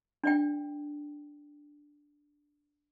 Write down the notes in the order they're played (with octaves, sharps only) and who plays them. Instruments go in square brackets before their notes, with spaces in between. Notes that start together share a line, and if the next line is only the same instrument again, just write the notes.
[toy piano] D4 D5 G5